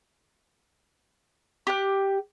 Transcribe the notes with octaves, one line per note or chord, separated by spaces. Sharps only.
G4 F#6